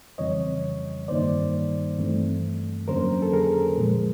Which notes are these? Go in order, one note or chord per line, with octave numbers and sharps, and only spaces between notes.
F2 C#3 E3 G3 C4 C#5 D#5
G2 D#3 G3 A#3 D#4 C5 D5
G2 E3 A3 C4
F2 D3 F#3 A#3 C#4 A#4 C5
A4
G#4 A#4
A#2 F3 G#3